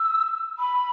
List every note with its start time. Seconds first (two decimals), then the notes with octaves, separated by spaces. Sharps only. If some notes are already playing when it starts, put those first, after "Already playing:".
Already playing: E6
0.59 B5